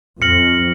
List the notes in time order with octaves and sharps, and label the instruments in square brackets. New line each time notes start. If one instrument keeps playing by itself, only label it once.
[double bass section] F2 [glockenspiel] F6 A#6 C#7 F#7